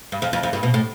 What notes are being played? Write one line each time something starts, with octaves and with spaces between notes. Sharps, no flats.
G2
F2
F2
F2
G2
B2
A2